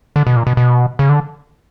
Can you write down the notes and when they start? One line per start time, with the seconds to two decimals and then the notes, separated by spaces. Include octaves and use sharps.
0.16 D3
0.27 B2
0.36 A#2
0.47 B2
0.57 B2
0.99 C#3
1.09 D3